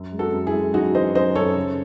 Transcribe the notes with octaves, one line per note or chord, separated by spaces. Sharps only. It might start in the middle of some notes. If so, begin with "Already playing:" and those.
Already playing: F#2
G#3
F#4 A4
F#2
E4 G#4
G#3
F#2 D#4 F#4
E3 C5 D#5
F#2 C5 D#5
F#2 A4 C#5
C#3